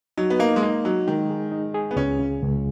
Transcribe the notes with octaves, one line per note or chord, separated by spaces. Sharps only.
F#3 D#4
B3
A#3 D#4
G#3
A#3 D#4
F#3 D#4
D#3 G#3
G#4
D#4
G#4
B3
C#2 C#4
C#3
C#2